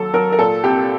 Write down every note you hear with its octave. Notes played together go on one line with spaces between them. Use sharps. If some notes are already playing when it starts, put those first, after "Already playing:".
Already playing: D#2 F#3 A4
F#3 A#4
A#4
A#2 A4
C2 G4